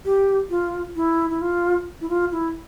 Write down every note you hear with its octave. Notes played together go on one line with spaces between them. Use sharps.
G4
F4
E4
E4
F4
E4
F4
E4